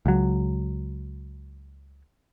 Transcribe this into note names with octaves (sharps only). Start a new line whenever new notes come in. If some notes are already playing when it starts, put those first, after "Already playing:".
C#2 F#3